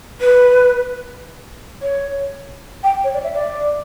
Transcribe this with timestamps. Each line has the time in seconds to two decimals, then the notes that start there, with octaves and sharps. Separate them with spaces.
0.21 B4
1.82 C#5
2.83 G5
3.04 C#5
3.14 D5
3.24 E5
3.34 D5